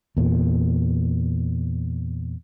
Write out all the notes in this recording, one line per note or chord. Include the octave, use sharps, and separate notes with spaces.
E2 A#2